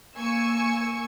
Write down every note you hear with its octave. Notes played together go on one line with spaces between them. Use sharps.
A#3 G#5 C#6 E6 C#7